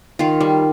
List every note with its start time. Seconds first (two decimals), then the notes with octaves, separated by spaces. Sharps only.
0.19 D#3 F4
0.41 G3